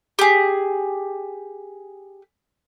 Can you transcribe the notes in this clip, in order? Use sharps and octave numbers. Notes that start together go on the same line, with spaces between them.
G4 G#4